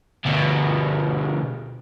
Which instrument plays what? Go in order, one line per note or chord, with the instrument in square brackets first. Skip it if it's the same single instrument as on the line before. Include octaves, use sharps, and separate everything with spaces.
[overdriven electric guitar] D2 B2